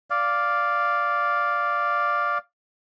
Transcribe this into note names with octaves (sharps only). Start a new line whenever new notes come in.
D5 F5